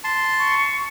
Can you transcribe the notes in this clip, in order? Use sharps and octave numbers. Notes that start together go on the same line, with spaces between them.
A5 C6
C#6